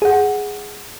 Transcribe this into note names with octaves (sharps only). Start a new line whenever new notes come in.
G#4 F#5